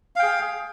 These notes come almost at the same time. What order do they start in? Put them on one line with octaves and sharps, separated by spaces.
F5 G5 G#4